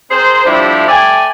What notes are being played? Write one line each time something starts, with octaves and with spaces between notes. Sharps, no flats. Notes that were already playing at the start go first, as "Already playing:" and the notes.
C4 G#4 A#4 C5
A2 C3 F3 G3 D4 E4
A3 D5 G5 G#5